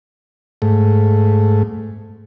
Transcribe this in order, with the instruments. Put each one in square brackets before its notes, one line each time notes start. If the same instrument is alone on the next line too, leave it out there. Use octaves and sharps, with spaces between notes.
[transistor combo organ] G#2 A3